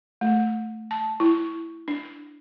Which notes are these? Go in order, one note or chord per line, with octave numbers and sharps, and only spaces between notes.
A3
A5
E4
D4